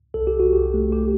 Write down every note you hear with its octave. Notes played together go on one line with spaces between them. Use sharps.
C2 A4
G4
C2 F#4
G4
A3
G4